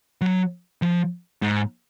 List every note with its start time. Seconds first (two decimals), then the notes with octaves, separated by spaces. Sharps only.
0.21 F#3
0.82 F3
1.42 G#2